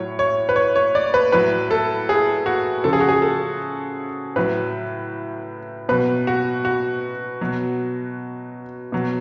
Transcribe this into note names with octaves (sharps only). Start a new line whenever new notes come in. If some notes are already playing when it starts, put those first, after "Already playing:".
Already playing: A2 F#3 C#5
C#5
B4
C#5
C#5
D5
B4
A2 F#3 B4
A4
G#4
F#4
C#3 F3 A4
G#4
F#4
G#4
A4
A2 F#3 B4
B2 F#3 B4
F#4
F#4
B2 F#3
B2 F#3